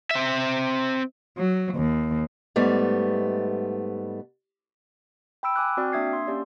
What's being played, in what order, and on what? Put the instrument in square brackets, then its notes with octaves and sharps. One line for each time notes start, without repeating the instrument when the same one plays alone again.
[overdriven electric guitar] C4 E5
[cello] F#3
D#2
[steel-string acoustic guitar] G#2 G3 A3 B3
[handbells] G5 B5 E6 D7
G#5 D6 F#6
C4 F#4 D5 G5 F6
A#3 D4 E5 D#6 G#6 C7
C6
A#3 C#4 G4 D5